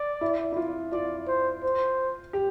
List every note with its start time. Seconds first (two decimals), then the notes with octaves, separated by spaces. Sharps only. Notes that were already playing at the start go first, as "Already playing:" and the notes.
Already playing: D5
0.21 E4
0.52 E4
0.57 F4
0.92 F4 D5
1.28 C5
1.63 C5
2.33 G4